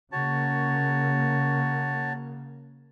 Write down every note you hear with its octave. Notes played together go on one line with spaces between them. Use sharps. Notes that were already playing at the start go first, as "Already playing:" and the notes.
C#3 A#3 F#4 C#5 A5